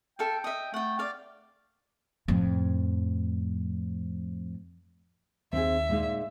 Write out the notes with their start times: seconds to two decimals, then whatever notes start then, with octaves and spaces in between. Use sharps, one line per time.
0.19 A4 E5 F5 G5
0.44 D#5 E5
0.74 A3 F#5 G5
0.99 D5 F5
2.28 F2 A2
5.53 D#2 C4 D#4 G#4 E5
5.89 A#2 G#3 D#4